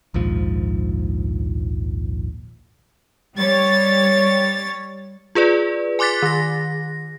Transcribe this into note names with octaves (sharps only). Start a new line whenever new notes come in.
A#1 D#2 G#2 F3
G3 C#5 A6
F4 G#4 B4 D5
G#5 C6 D6 F#6 A6 B6
D#3 A#6